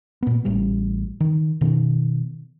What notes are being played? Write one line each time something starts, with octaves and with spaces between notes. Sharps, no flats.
A#2 B3
A1 A2 G3
D#3
B2 D#3